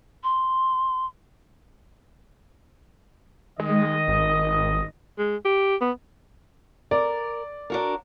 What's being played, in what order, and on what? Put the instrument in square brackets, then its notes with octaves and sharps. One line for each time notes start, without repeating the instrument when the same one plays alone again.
[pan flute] C6
[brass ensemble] D#3 D#5 [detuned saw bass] G#3
[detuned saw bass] G#1
[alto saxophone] G#3
G4
B3
[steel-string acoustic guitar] A#4 [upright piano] D5
[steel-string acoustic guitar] D4 F#4 A#4